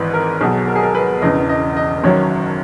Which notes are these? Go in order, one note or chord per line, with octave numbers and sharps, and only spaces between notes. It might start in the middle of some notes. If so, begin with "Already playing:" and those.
Already playing: G#1 G#2 E3 B4
A#4
B1 B2 F#3 G#4
A#4
G#4
A#4
B4
E1 E2 C#3 E3 D#5
D#5
D#5
F#1 F#2 D#3 F#3 C#5